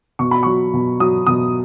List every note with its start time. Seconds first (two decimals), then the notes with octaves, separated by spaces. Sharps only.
0.19 B2 C#6
0.31 B5
0.43 F#3 C#6
0.74 B2
1.00 F#3 D#6
1.27 B2 D#6